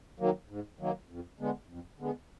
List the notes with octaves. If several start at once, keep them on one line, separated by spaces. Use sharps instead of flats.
D#3 F#3 A#3
G#2
D#3 F#3 A#3
F2
D3 G#3 B3
F2
D3 G#3 B3